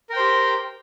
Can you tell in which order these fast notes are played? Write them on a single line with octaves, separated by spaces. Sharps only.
A#4 G5 C5 G4